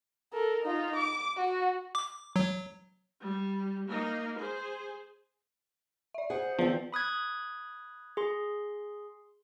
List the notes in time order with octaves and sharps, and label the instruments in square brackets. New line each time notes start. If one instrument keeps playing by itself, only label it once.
[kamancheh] A4 A#4
D#4 F4
D6
F#4
[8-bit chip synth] D6
F#3
[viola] G3
A#3 D#4
G#4 C5
[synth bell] D5 E5
[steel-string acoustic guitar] G#4 F#5 [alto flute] C5
[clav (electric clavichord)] F3 [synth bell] B3 B4 [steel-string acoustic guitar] C4 D5 G5
[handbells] B5 D#6 F#6 G#6
G#4 C6